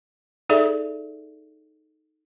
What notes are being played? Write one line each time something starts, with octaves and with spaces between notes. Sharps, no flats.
D#4 G#4 A4 D5 E5